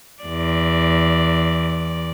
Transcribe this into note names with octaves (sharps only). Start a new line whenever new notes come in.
E2 D5